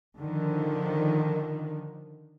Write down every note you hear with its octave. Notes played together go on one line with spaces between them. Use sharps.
D3 D#3 F3